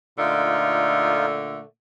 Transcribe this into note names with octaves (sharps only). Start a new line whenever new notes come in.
A#2 D3 A3 D#4 F4